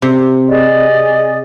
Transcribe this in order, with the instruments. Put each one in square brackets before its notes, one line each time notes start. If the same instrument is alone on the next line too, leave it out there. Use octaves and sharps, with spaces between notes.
[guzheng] C3
[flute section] G#4 D5 D#5